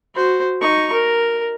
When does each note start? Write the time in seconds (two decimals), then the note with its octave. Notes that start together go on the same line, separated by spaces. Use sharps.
0.15 F#4 C5
0.61 D#4 C#6
0.93 A#4